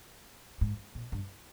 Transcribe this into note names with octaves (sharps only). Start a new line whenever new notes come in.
G#2
A#2
G2